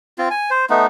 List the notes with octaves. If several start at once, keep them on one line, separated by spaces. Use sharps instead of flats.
C4 F4
G#5
C5
A3 B3 D#4